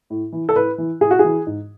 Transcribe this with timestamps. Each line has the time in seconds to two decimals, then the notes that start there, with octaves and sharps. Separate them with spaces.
0.10 A2
0.32 E3
0.49 A4
0.55 A2 B4
0.78 E3
1.01 A2 G#4
1.11 F#4
1.19 G#4
1.24 E3
1.47 G#2